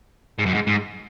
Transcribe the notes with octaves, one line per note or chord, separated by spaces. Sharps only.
G#2
F#2
G#2
G#2